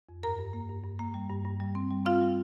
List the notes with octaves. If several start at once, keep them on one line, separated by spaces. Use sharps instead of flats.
F2
G2 A#4 A#5
G2
A#3
G2
G2
A#3
G3
G2
G2
G3
C4
G3
C4 F4 F5
G3